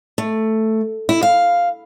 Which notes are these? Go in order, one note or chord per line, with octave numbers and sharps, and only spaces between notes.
A3
E4
F5